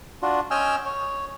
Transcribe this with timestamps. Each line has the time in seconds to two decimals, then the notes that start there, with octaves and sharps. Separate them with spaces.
0.22 D4 F4 F#4
0.51 C#4 D#5 G5 G#5 E6 F6
0.85 C#5